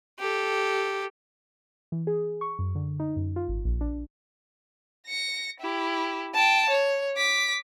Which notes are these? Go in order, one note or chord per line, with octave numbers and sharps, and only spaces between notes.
G4 A4
E3
G#4
C#6
F#2
D3
D#4
F#2
F4
G#1
A#1
D4
A#6 C#7
E4 G4
G5 A5
C#5
D6 B6